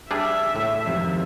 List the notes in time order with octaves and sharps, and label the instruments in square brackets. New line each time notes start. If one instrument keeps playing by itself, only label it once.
[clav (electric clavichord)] G3 D4 G#4 [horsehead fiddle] E5
[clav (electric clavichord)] A2
[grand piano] G#1 F2 C3